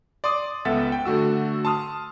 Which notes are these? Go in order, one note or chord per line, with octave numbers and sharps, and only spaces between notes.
D5 C6 D6 D#6
C#2 B3 A4 E5 F#5 A6
G5
D3 A3 F#4 E6
A5 C6 D#6 F6